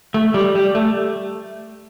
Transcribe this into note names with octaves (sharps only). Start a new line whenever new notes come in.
A3
G3
G3
A3